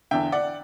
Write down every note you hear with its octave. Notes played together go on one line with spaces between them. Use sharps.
E2 D3 E5 G5
D5 F#5